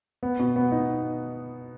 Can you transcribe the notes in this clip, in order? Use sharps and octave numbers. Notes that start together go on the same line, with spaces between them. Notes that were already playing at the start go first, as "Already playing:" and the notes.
B3
B2
B3
D#4